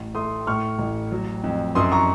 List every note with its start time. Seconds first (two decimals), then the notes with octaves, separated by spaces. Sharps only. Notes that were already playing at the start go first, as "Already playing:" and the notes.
Already playing: A1
0.15 A3 C6 D#6
0.47 A2 C#6 F6
0.79 A1
1.12 F#3
1.44 F2
1.75 F#2 C6 D#6
1.92 A#5 C#6